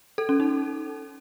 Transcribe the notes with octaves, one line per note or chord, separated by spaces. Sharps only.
A4
C#4
D#4